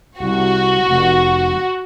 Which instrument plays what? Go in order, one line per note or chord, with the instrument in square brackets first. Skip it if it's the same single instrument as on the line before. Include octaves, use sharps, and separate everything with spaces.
[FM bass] C2 [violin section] F#4
[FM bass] F1